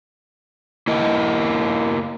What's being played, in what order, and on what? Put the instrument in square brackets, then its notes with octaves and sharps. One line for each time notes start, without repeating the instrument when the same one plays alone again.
[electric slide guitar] A#3 E4 A#4 D#5